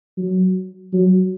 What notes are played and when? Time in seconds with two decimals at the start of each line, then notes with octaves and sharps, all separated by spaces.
0.17 F#3
0.93 F#3